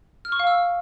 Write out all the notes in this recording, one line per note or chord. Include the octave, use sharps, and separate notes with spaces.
F6
C#6
F5
E6